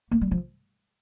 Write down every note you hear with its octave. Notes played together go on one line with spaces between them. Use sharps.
A#3
G3
F3